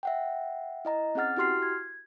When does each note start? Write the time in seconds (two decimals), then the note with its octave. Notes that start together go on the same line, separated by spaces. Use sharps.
0.03 E5 F#5 G5
0.85 E4 D#5 A#5
1.15 C4 C#4 G#4 F#5 F6 A6
1.37 E4 F#4 G4 C6 F6 C7
1.62 G#6